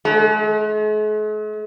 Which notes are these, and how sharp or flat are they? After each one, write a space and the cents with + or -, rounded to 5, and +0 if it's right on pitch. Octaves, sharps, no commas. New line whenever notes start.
G#3 +45